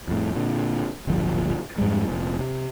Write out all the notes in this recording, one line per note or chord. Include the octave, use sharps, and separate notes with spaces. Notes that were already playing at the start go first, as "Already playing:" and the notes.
F2 A2
A#2 D3
D1 G1 A#2 F3
F2 G#2 G3 G#3
F1 A#2
C3